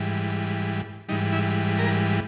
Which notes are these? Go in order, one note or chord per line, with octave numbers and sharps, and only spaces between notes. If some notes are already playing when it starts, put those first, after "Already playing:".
Already playing: G#2 E3 G3
G#2 E3 G3 D#4
E4
A#4